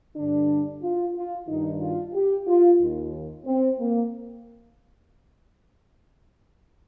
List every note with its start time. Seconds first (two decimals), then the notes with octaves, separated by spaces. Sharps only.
0.16 G2 D3 D4
0.82 F4
1.15 F4
1.48 G2 D#3 D#4
1.81 F4
2.14 G4
2.47 F4
2.80 D#2 D#3
3.46 C4
3.79 A#3